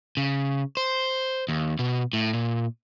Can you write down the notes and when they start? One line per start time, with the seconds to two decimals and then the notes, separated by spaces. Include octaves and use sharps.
0.17 C#3
0.77 C5
1.49 D#2
1.79 B2
2.13 A2
2.33 A#2